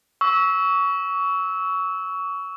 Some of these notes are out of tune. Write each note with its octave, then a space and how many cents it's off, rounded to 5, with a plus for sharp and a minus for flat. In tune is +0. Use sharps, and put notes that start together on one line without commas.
C#6 +25 E6 -15